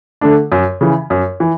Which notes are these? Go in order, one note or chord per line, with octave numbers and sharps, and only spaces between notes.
D3 A3 D4
F#2
C#3 E3
F#2
E3